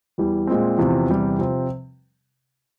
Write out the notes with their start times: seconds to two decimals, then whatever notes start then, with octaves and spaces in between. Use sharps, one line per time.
0.18 E2 E3 G3
0.47 A#2 G#3 C4
0.78 E2 C3 F3 C4
1.09 E2 C3 G3
1.39 C3 F3 C4